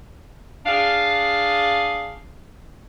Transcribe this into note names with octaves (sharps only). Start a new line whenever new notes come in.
D4 G#4 F5